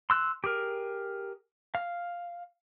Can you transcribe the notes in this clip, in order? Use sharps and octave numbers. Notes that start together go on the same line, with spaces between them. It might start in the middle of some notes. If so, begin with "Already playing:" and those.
C6 E6 F#6
G4 G#4 A#4
F5